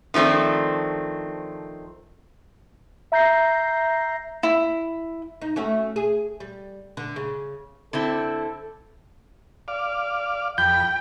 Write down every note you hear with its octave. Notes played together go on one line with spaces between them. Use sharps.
D#3 F3 A3 C4 D4
E5 A#5 G6 A#6 C7
E4
D#4
A3 C#4 F#4
G#4
G3
D3
C#3
D3 C4 E4 A4
D5 F5
F2 G5 B5 G6